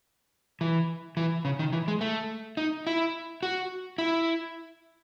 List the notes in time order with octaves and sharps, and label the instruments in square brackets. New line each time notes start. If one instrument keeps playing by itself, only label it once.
[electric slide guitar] E3
E3
C#3
D#3
E3
G#3
A3
D#4
E4
F#4
E4